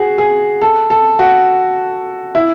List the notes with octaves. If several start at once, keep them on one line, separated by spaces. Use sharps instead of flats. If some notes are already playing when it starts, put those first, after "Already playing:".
Already playing: F#4 G#4
G#4
A4
A4
F#4
E4